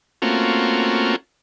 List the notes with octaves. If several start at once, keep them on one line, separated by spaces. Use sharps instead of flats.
A3 A#3 C4 C#4 F4 F#4